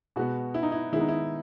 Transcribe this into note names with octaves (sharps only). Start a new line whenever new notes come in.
B2 G#3 B3 F#4
E4
D#4
E4
D#3 G#3 B3 E4
D#4
E4